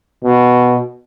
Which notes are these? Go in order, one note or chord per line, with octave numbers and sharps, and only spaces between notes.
B2